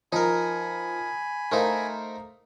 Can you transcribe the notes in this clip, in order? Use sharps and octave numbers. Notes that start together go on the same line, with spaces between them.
F3 D#4 A#4 G#5 B5
A3 D#4 A#4 C5 F5